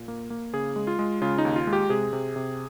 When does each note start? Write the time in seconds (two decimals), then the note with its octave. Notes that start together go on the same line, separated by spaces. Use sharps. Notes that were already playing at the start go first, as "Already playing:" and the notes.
Already playing: A#2
0.08 A#3
0.30 A#3
0.53 C#3 G#4
0.76 G#3
0.87 F4
0.99 G#3
1.21 C#3 F4
1.38 D#4
1.45 D#2
1.56 F4
1.67 G#3
1.73 G4
1.89 C3 G#4
2.13 C3
2.36 C3